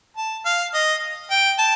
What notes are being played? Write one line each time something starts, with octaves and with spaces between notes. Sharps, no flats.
A5
F5
D#5
G5
A5